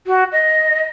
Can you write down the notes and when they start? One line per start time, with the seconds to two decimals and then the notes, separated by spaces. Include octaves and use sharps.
0.06 F#4
0.32 D#5